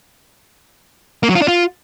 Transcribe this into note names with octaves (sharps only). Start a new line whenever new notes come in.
A#3
F#3
F4
D4
F4